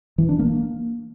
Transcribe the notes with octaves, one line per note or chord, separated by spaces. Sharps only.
E3
D4
A#3